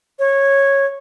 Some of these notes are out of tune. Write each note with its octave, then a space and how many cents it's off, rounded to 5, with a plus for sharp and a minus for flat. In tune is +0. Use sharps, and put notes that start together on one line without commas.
C#5 -10